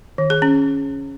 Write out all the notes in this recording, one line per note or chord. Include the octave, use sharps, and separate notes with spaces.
D#3
G#4
C#4